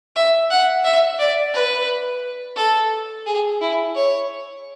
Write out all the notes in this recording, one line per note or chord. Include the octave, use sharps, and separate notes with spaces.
E5
F#5
E5
D5
B4
A4
G#4
E4
C#5